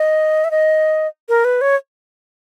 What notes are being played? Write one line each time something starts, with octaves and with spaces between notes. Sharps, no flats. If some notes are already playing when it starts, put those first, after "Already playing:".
Already playing: D#5
E5
D#5
A#4
B4
C#5